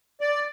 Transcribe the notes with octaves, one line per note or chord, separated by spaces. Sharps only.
D5